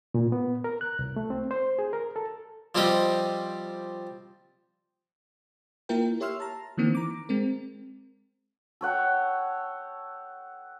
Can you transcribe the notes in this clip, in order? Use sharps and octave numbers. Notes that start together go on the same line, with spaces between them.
A#2
B3
A#4
F#6
C2
A3
C4
C5
G#4
A#4
A4
F3 G3 C4 G4 D#5
A#3 E4 F4 A#4 G5
G4 C#5 E5 C6 E6 F6
A5 A#5
D#3 E3 A#3 C4
A#5 D6
G#3 C4 A#4
A4 C#5 F#5 G5